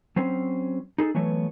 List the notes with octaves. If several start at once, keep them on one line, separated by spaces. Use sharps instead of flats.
F#3 C4 C#4 C5
D#4 G#4 A4
E3 F#3 A3 B3 C#5